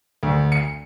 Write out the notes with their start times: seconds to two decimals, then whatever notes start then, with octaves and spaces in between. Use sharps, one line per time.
0.23 D2
0.52 C#7